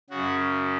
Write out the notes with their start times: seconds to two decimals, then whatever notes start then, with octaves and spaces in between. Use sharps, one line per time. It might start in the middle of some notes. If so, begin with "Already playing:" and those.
0.10 C#3 F#4
0.15 F#2